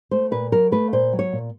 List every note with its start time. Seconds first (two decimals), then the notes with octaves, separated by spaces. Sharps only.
0.11 A3 C5
0.31 A#2 B4
0.52 F#3 A#4
0.72 A3 B4
0.93 A#2 C5
1.13 F#3
1.19 C#5
1.33 A#2